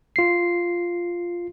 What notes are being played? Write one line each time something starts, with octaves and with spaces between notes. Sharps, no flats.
F4 C7